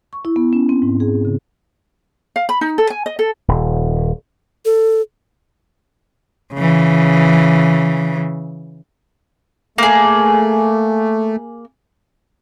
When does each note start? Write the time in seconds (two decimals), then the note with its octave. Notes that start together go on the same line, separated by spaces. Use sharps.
0.13 C#6
0.25 E4
0.36 B3
0.53 C#4
0.69 C4
0.82 G#2
1.00 G#4
1.25 C#3
2.36 F5
2.49 B5
2.61 D#4
2.78 A4
2.90 G#5
3.06 D#5
3.19 A4
3.48 D#1
4.65 A4
6.54 C#3 E3
9.78 A3 A#3 G#4